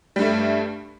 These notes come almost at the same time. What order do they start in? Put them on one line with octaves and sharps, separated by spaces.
G3 G2 A3